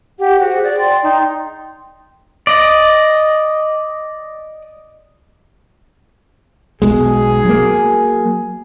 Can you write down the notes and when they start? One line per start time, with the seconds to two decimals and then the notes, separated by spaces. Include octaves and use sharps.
0.19 G4 F#5
0.40 F#4 G#4 C5
0.63 D5
0.78 G5 C6
1.03 D#4
2.47 D5 D#5
6.82 B1 B2 G#3 G#4
7.45 F#3 A#3